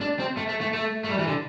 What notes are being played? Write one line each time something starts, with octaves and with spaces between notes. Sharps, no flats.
D4
C4
A3
A3
A3
A3
A3
G3
E3
D3